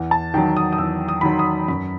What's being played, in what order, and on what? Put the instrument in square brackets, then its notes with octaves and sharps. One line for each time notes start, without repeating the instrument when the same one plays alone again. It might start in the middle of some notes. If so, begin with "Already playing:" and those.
Already playing: [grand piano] E2
A5
D#3 F#3 G5
D#6
D#6
E2 E6
D#6
D#3 F#3 B5
C6
D#6
F#2 B5